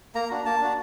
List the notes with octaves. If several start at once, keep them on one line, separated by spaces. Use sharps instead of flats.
A#3 A#5
D4 F#4
A#3 A5
D4 F#4